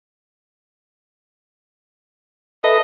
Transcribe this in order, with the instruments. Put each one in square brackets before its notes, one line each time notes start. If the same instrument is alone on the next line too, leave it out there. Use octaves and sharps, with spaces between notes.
[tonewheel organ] A4 B4 E5 [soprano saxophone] D#5